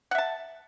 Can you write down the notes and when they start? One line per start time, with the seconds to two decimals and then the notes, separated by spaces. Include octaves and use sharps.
0.11 F#5
0.15 E5
0.18 A5